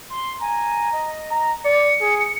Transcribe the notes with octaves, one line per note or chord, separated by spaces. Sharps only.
C6
G#5 A#5
D#5
A#5
D5 C#7
G#4